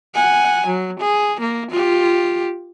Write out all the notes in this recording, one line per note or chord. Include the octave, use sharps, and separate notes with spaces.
F#5 G#5
F#3
G#4
A#3
F4 G4